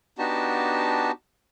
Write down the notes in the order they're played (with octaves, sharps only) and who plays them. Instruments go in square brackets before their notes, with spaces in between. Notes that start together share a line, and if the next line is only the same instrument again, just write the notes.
[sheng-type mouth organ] B3 D4 D#4 F#4 G4 A5